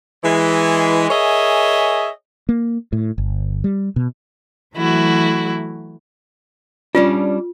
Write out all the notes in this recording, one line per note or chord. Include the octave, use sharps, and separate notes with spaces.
E3 G#3
G#4 A#4 C#5 D#5 E5 G#5
A#3
A2
G1
G3
B2
E3 F#3 A3 E4 F#4
G3 C#4 D4 F4